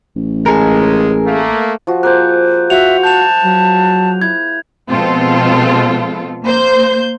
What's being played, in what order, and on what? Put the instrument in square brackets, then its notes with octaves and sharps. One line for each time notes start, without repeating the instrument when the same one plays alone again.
[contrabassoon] A1
[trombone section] C#2 G#3 [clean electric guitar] G#4 A#4
[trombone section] A3 A#3
[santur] F3 F#4
[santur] A#3 G#4 C5 [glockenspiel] F#6 G6
[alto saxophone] F#4 [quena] E5 [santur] F5 [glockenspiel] F7
[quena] A5 [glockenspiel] G6 F7
[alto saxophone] F#3
[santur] E4 [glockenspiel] G#6
[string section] B2 F3 G#3 C4 F4 A4
A#3 C5 G6